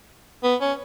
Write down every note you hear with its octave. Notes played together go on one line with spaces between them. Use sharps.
B3
C#4